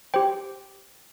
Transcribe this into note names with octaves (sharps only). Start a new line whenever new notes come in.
G4 C5 G5